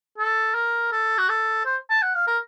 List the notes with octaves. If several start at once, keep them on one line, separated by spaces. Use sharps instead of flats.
A4
A#4
A4
F#4
A4
C5
A5
F#5
F5
A#4